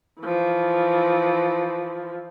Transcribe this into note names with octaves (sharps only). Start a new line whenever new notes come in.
E3 F3